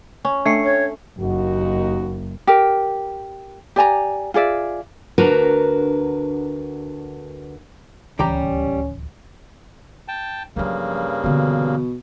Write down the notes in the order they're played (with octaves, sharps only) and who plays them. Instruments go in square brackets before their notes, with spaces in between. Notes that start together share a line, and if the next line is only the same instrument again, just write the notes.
[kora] C#4
[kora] A3 [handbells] D4 C7 C#7
[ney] C#5
[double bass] F#1 [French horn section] D#2 D#4 F#4
[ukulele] G4 A#4
G4 D5 G#5 A#5
F4 G#4 D5 E5
[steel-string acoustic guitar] D2 D4 F#4 A#4 B4 A#5
[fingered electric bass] D1 C#2 E3 [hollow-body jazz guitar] G3 G4 A#5 [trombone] C#4
[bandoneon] G5 A5
[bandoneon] G2 C#3 A#3 [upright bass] F3 F#3
[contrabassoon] B2 [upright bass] D3 E3